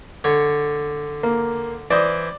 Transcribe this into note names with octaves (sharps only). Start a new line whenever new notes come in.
D3 C#5
A#3
E3 C5 D5 D#5